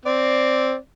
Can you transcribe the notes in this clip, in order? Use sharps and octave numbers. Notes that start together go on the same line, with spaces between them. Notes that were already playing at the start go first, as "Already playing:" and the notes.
C4 D5